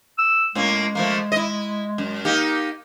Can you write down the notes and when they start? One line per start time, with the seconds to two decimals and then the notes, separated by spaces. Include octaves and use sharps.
0.18 E6
0.55 A2 G#3 A#3 C#4
0.95 F3 A3 A#3
1.32 E4 D#5
1.98 F#2
2.25 A#3 D#4 G4